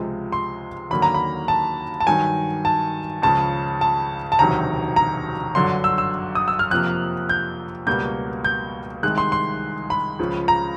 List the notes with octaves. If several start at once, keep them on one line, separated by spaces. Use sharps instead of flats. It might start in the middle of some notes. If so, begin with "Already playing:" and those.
Already playing: C#2 C3 F3 G#3
C6
D#2 D3 F#3 A#3 B5
A#5
B5
A5
A5
G2 D#3 F#3 G#5
A5
C#2 C#3 F3 A5
A5
A5
E1 D2 C3 D#3 F#3 A#5
A#5
G1 F#2 D3 F#3 C6
E6
E6
D#6
E6
F6
F2 C3 F3 A#3 F#6
G6
C#2 B2 G3 A#3 G6
G6
C2 C3 D#3 G#3 F#6
C6
C6
B5
C#2 C#3 F3
A#5